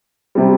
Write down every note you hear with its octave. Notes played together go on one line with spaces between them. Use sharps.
C3 G3